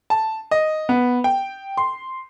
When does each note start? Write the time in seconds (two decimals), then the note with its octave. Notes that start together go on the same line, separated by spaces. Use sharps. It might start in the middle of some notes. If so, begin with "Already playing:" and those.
0.10 A5
0.51 D#5
0.89 B3
1.24 G5
1.77 C6